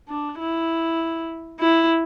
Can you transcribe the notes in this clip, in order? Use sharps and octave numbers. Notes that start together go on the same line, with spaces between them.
D4
E4
E4